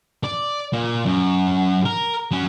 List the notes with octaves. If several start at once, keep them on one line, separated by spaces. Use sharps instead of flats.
D5
A#2
F#2
A#4
F#3 C#4